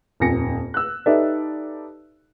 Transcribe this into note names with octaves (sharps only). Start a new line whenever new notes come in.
D#1 F2 G#5 A#6 C#7
E6 F#6
D#4 G4 A4 B4 D5 E5